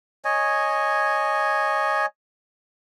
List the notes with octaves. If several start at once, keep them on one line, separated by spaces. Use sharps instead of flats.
C#5 D#5 G#5